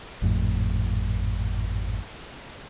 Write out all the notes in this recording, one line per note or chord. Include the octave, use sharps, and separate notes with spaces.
G#1 F2 A2